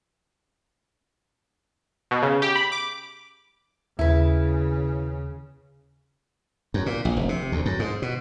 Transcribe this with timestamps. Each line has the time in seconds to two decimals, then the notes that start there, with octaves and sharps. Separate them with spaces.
2.11 B2
2.23 C#3
2.42 G4
2.55 B5
2.72 D6
3.99 D#2 C#3 E4 B4
6.74 F#2
6.86 A#2
7.05 A#1
7.17 F1
7.29 C3
7.52 D2
7.66 F#2
7.79 G#2
8.02 B2